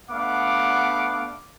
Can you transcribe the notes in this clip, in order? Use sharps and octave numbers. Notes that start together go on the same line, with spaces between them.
A3 B3 D4 F5 F#5 D6